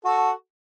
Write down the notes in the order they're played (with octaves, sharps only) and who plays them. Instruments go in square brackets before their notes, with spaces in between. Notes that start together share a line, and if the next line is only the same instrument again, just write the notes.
[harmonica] F#4 A4